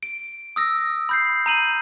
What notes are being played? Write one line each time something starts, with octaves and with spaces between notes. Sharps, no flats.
D7
D#6 E6 A#6
B5 G6 C7
A#5 D#7 F#7